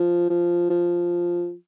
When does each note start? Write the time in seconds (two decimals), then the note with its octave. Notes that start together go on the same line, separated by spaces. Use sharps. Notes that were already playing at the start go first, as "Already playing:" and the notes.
Already playing: F3
0.30 F3
0.70 F3